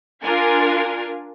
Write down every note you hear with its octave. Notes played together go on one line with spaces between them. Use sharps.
D4 F4 A#4 F5 G#5